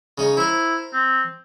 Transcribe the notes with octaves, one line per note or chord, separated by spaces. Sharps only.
C#3 C#4 D#4
E4 A#4 C5
C4